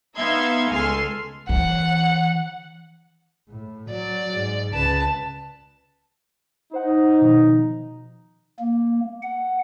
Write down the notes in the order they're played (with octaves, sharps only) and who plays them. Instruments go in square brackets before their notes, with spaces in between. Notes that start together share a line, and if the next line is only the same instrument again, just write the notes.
[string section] B3 D#4 E5 F5 C6 G#6
C#2 A4 G#5 C6 F6 C7
[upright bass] E3 [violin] F#5
[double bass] A2
[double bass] F#3 [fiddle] D5
[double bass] G#2
[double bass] C#2 C#3 [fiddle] B4 A5
[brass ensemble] D#4 [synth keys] C5 F#5
[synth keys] B2 D#3 F3
[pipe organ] A#3
F#5